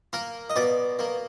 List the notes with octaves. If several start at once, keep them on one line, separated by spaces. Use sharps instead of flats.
A#3 A#4
D#5
B2 D5
A#3